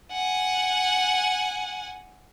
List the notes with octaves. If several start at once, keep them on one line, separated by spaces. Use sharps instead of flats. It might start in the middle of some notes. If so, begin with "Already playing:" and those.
F#5 G#5